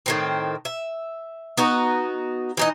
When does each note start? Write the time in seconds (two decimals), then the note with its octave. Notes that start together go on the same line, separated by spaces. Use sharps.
0.06 A2 D#3 C4
0.65 E5
1.57 B3 D#4 F#4
2.57 E3 D#4 D#5